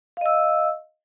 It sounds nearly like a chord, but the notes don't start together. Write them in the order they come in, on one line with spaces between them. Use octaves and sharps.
F5 D#5 E6